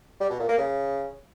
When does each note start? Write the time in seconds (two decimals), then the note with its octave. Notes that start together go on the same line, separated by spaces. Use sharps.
0.20 G3
0.30 B2
0.39 A#2
0.49 A#3
0.58 C#3